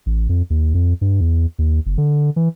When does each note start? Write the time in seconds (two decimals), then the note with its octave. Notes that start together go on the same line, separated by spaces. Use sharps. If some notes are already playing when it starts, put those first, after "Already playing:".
0.06 A1
0.29 F2
0.50 D#2
0.74 F2
1.01 G2
1.21 E2
1.59 D#2
1.86 F#1
1.98 D3
2.36 E3